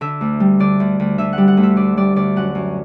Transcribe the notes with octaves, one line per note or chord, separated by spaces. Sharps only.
D3 E5
D2
G3
D3 D5
D2
D2
D3 E5
G3 F#5
F#5
D2
E5
D3 D5
G3 D5
D2 D5
F#2 F#5
F#2